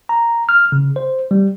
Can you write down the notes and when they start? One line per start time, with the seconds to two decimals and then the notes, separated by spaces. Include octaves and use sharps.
0.09 A#5
0.49 F6
0.72 C#3
0.96 C5
1.31 G3